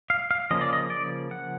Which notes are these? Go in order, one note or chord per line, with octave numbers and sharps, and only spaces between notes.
F5
F5
C#3 F3 A#3 C#4 D#5
D5
D#5
D5
F#5